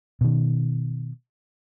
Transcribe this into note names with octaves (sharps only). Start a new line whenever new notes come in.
B2 D#3